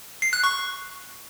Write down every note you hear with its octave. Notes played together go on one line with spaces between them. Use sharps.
C7
F#6
C#6